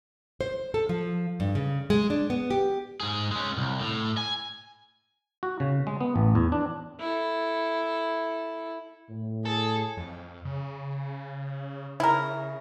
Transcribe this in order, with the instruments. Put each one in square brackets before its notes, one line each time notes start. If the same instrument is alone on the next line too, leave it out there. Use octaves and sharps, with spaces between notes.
[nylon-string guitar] C5
A4
F3
G2
C#3
G#3
D4
B3
G4
[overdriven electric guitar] G#2 G#4
G#3 C#4
C2
A2
G#5
[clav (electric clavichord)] F#4
C#3
G#3
B3
A1
E2
D4
[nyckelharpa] E4 A4
[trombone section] A2
[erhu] G#4 [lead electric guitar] A4
[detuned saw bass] F2
C#3
[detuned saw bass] C#3 [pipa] E4 A#4